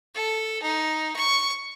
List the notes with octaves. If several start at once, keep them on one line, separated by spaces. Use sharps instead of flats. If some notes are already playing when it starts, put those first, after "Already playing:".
A4
D#4
C#6